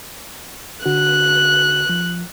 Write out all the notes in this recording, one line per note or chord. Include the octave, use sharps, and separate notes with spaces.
D3 F#4 F#6
F3